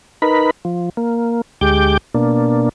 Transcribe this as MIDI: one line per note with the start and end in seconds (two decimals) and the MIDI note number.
0.22 0.51 63
0.22 0.51 70
0.22 0.51 71
0.22 0.51 83
0.65 0.89 53
0.97 1.41 58
1.61 1.97 38
1.61 1.97 56
1.61 1.97 67
1.61 1.97 86
1.61 1.97 91
2.14 2.69 47
2.14 2.69 58
2.14 2.69 62